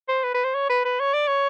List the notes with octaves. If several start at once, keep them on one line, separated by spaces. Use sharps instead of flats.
C5
B4
B4
C5
C#5
B4
B4
C#5
D5
C#5